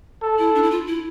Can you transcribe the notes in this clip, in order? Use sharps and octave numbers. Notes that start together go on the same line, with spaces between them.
A4
E4
D4
E4
F4
E4